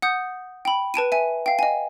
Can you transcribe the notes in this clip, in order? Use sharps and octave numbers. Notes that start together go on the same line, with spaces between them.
F#5 D#6 G6
G5 B5
B4 A5 D7 D#7
E5 G#5
F5 G5
D#5 G#5